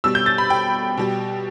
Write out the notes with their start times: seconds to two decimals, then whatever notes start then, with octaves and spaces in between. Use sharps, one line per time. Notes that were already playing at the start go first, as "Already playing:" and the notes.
0.04 B2 G3 E6
0.15 G6
0.26 A6
0.38 B5
0.50 G5
0.97 B2 G3